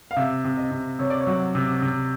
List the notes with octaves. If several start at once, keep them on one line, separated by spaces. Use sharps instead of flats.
F5
C3 E5
C3
D#5
C3
C3 C#5
D5
C#5
F#3
C3
C3